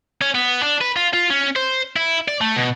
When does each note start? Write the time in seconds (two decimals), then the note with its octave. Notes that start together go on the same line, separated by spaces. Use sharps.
0.21 C#4
0.35 B3
0.63 D4
0.81 B4
0.96 F4
1.13 F4
1.30 C#4
1.56 C5
1.96 E4
2.28 D5
2.41 A3
2.56 B2